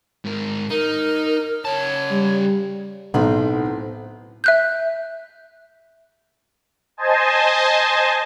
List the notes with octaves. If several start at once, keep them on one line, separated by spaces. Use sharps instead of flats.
G#2 A#4
D#4 A#4
C#3 C#5 A5
G3
B1 A2 B3 C4
E5 F#6 G6
C5 D#5 G#5 A5